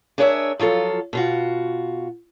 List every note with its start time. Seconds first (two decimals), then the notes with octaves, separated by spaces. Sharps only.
0.18 D4 G#4 A#4 C#5 D#5 E5
0.59 F3 F#3 F4 A4
1.13 B2 F4 F#4